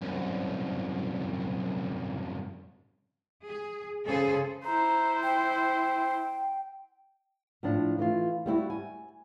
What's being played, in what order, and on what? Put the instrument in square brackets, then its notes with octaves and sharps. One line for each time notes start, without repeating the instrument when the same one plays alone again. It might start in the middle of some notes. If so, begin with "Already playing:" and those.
[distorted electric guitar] C2 F#2
[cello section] G#4
C#3 G#4 A4 C5
[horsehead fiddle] E4 C5 [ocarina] A#5
[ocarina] G5
[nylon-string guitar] A2 F3 D4
E3 A3 F4
G3 B3 E4 F#4
G#5